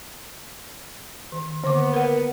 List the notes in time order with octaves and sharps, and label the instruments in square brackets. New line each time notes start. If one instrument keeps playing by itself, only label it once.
[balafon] D#3
[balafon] D3 D6 [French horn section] A#3 B3
[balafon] A#4 F#5